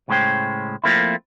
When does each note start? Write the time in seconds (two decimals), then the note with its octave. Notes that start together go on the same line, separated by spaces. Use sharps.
0.08 C#2 A2 G#3 C#4 C5 G5
0.84 F3 A3 A#3 C4 E4